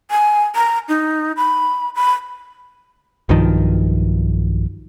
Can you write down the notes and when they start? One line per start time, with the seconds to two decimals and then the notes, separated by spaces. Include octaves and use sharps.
0.11 G#5
0.56 A#5
0.89 D#4
1.37 B5
1.95 B5
3.29 B1 G2 D#3 F3